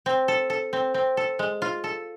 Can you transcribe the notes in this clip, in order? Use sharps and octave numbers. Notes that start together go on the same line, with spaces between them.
C4
A4
A4
C4
C4
A4
G#3
F4
A4